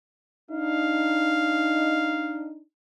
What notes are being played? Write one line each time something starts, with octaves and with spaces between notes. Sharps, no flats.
D4 D#4 F5